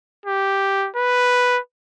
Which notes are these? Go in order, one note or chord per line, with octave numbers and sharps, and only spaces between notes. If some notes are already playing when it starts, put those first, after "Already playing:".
G4
B4